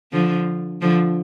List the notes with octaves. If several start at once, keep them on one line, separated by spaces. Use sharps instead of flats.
D3 F3
D3 F3